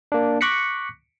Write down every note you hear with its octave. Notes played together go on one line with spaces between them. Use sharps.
A#3 D4
C#6 D6 F#6 A#6 B6 C#7